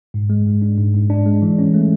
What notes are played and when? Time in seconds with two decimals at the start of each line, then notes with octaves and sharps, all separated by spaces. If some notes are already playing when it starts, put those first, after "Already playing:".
0.14 G#2
0.30 G#3
0.46 G#2
0.62 D4
0.78 G#2
0.94 G#2
1.10 D4
1.26 G#3
1.42 E3
1.58 C#4
1.74 A3